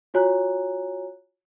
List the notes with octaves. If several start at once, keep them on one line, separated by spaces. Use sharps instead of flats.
F4 F#4 C#5 G#5 A#5 F#6